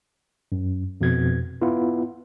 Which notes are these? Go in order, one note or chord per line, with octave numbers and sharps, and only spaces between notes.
F#2
F2 B2 G#6
B3 E4 F4